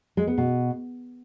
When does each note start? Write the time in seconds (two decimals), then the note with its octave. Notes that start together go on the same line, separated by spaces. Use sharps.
0.17 G#3
0.27 B3
0.38 B2